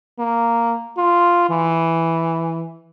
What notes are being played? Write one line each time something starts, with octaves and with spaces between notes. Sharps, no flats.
A#3
F4
E3